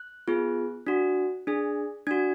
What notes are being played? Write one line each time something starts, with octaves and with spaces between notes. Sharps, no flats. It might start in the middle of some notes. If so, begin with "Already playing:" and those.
Already playing: F#6
B3 F4 G#4
D4 F#4
D4 G#4
D4 F#4 G#6